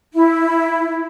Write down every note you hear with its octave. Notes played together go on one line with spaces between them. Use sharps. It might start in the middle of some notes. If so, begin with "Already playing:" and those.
E4